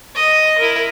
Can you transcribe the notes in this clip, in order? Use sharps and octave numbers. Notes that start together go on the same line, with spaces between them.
D#5
E4 A#4